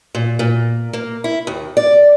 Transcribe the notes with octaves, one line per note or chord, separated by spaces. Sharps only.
A#2
A#2
A#3
E4
D#2
D5